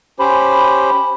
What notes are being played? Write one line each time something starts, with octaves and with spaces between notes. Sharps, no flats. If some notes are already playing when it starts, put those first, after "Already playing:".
C#4 G4 C5 B5